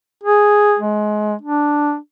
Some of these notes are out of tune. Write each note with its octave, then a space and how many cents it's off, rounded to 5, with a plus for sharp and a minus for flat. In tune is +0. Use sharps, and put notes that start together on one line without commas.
G#4 +0
G#3 +25
D4 +0